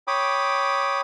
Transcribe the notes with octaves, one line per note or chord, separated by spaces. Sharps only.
C#5 G5 B5 D6 D#6